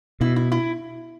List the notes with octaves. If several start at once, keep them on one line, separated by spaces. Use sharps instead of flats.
B2 E4
E4
E4